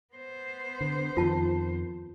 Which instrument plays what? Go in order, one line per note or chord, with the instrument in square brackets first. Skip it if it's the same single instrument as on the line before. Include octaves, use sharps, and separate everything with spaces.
[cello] B3 C5
[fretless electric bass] D3
[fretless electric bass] F2 D#3 [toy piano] F4 A5